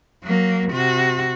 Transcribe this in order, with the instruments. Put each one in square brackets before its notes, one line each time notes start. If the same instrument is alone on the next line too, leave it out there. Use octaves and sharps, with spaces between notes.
[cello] F#3 A#3
C3 F#4